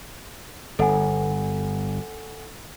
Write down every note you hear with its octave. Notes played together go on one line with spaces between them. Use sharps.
G1 A4 F#5 G#5